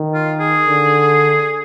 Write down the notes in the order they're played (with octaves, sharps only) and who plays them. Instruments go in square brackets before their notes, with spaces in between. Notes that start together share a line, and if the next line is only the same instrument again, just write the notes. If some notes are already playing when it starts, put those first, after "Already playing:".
Already playing: [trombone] D#3
[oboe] F4
G#4
[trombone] D3